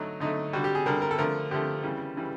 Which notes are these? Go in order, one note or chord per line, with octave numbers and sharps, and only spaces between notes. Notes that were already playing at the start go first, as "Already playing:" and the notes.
Already playing: D3 F#3 A3 D#4
D3 F#3 A3 D#4
D3 G3 F#4
G4
G#4
D3 G3 A#4
A#4
A4
D3 F3 A3 A#4
D3 F3 A3 G4
C#3 E3 G3
C#3 E3 G3